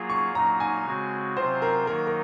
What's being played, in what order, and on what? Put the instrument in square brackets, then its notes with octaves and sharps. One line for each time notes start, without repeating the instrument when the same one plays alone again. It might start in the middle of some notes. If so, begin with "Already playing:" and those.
Already playing: [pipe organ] F#3 A#3 F4 G#4
[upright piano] C#6
[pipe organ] A#2 F#3 A#3 D#4 [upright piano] A#5
[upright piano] G#5
[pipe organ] C#3 G#3 C4 F#4
[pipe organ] C3 F#3 C4 F4 [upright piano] C5
[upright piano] A#4
[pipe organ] D#3 F#3 A#3 D#4 [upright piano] A#4
[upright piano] A#4